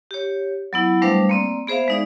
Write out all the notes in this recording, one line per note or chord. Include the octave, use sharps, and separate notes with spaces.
G4 C#5
F#3 B3 E4
G3 A3 D4 B4 C5 F5
A#3 C4 D5
B3 G#4 C5 E5 F5
G#3 D#4 D5